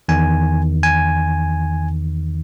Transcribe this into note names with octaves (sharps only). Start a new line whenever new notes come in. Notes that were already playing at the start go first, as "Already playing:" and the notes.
E2 D#3 G#5
G#5